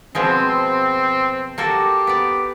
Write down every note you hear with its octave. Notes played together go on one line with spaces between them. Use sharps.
B2 F3 G#3 C4
A#3 F#4 G4 A4
B3 D5